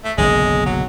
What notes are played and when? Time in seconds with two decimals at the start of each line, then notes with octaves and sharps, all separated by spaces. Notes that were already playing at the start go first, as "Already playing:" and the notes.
0.05 A3
0.18 F#1 B1 D3 G#3
0.66 F#3